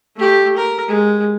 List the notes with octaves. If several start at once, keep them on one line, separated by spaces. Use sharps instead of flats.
A3 G4
A#4
G#3